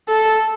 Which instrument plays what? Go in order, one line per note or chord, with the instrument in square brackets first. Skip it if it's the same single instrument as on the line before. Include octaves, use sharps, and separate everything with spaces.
[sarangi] A4